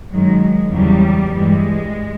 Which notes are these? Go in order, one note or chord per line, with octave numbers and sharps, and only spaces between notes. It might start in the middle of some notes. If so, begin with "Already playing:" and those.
F#2 D#3 F#3 G#3
E2 C#3 F#3 G3
G2 E3 G3 G#3